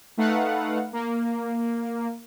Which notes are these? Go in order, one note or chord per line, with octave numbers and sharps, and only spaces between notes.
A3 D#4 B4 F5 F#5
A#3